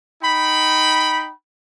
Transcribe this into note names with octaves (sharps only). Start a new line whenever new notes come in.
D#4 G5 B5